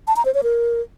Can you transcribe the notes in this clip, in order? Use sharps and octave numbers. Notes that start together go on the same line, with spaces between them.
A5
A#5
C5
C#5
A#4